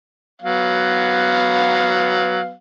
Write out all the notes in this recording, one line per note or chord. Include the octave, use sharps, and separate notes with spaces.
F#3 B3 F5